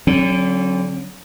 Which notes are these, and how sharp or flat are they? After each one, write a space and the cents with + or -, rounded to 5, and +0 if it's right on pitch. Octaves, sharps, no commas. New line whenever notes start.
D3 -25 F#3 +0 C4 +40